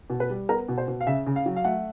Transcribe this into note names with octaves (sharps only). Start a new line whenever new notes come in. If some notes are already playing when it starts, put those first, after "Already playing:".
B2
B4
G3
B3 A#4
B2
C5
B2
F5
C#3 E5
C#3
F5
F#3
F5
A3 F#5